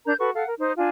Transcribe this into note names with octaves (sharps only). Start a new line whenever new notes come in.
D4 A#4 A#5 G6
F#4 A4 B4 C#6
A4 F5 F#5
A#4
D#4 C5
D4 F4 G#5